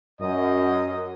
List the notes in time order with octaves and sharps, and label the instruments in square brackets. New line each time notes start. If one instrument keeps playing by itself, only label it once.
[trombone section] F#2 [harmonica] D#5